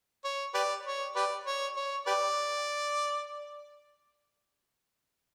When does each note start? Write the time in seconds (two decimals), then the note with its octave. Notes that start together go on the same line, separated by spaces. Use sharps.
0.24 C#5
0.54 G4 B4 D5
0.85 C#5
1.16 G4 B4 D5
1.46 C#5
1.76 C#5
2.07 G4 B4 D5